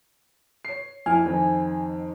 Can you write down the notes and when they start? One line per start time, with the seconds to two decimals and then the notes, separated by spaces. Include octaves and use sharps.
0.65 C#5 C7
1.06 F2 E4 G#5 F6
1.26 F2 D#3 C4